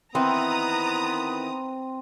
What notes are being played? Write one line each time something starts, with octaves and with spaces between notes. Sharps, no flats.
D#3 E3 B3 C4 E4 A#5 D#6